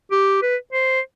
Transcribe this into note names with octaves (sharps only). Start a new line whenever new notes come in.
G4
B4
C5